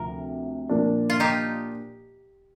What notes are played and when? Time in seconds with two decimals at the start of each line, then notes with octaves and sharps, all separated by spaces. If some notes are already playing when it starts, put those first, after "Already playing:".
Already playing: D2 C3 F3 A#4
0.69 A#2 F3 A#3 D4
1.10 F4
1.20 D#4 G4